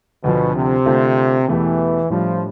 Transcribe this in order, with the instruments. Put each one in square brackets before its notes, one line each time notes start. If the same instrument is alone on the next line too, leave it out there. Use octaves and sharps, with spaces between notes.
[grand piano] D2 D3 F3 [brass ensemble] B2
[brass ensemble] C3
[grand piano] D3 A3 C4 F4 A4
[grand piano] E2 B2 A3 E4 G4 [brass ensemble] E3
[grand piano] A2 G3 D4 [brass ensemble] F3